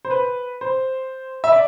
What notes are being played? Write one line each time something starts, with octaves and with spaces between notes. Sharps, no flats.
C5
B4
C5
E5
D5